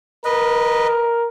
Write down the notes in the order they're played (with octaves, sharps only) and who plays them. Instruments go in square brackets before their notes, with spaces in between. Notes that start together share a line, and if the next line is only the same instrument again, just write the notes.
[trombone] A#4 [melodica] B4 D#5